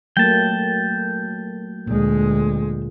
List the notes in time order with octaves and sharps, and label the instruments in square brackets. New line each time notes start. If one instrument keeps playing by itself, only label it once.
[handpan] F#3 A3 A#3 [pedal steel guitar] G5 A5
[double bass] D2 G#3 [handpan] A#2